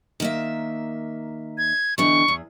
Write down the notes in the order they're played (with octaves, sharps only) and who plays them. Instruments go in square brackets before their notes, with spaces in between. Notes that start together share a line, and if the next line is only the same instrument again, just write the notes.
[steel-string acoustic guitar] D#3 A#3 E5
[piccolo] G#6
[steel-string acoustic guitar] B2 D3 E3 [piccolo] C#6
[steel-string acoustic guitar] E2